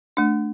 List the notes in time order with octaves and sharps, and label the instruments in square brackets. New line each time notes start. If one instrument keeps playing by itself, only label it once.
[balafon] A3 D4